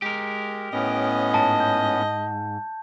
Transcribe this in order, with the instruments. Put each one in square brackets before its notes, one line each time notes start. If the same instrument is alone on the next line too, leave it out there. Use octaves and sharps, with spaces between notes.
[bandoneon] G#3 [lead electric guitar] G4 A#4
[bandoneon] A2 B3 C#4 [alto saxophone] D#5
[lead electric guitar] G#2 [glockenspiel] A5
[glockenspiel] G6